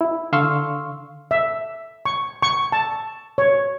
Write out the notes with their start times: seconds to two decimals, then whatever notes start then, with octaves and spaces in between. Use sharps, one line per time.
0.01 E4
0.33 D3 F5 C6 C#6 E6 F6
1.31 E5
2.06 C#6
2.42 C#6
2.72 A5
3.38 C#5